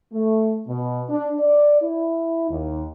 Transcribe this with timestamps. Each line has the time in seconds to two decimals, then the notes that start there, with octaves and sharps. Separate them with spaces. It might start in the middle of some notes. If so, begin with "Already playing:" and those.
0.13 A3
0.67 B2
1.09 D4
1.40 D5
1.82 E4
2.50 D#2